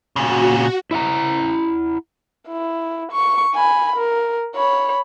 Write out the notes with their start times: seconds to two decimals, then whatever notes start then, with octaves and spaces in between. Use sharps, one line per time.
0.16 A#2 C#3 F#4
0.91 E4 E5 F#5 A#5
2.48 E4
3.12 C#6
3.55 G#5 B5
3.96 A#4
4.56 C#5 B5